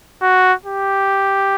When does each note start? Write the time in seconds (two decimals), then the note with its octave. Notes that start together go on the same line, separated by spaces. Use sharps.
0.22 F#4
0.66 G4